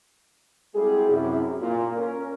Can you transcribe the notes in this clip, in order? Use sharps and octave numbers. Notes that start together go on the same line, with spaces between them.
G3 G#3 C4 E4 F#4 G#4
F#2 C3 E4
A#2
C#4 A#4